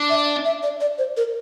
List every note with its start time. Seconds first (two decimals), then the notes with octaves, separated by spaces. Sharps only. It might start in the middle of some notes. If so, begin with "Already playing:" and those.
Already playing: D4
0.09 E5
0.45 E5
0.63 D5
0.81 D5
0.98 C5
1.17 A#4